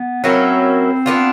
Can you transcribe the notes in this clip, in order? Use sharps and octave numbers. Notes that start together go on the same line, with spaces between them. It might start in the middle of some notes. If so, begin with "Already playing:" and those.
Already playing: B3
F#3 A#3 C4 C#4 E4
B3 D4 F4